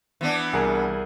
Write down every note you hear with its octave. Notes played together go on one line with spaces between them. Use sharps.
E3 B3 D4
C2 G#4 A#4